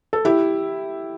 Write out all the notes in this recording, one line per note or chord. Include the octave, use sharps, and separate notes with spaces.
A4
E4 G4